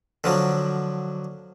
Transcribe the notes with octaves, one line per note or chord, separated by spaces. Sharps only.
D3 F3 F#3